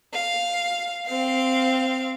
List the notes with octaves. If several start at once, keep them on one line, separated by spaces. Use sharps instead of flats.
F5
C4 F5